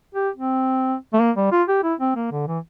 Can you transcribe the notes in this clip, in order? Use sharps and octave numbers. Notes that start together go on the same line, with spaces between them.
G4
C4
A3
A#3
G3
F4
G4
E4
C4
A#3
D3
E3